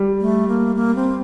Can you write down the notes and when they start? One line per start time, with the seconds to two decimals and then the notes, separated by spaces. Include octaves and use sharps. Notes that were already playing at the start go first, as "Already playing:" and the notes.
Already playing: G3
0.21 A3
0.48 A#3
0.76 A#3
0.95 C4